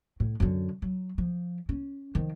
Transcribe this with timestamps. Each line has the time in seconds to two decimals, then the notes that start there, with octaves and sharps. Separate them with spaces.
0.20 A2
0.40 F#2 D3
0.82 F#3
1.18 F3
1.69 C#4
2.15 D#3 F3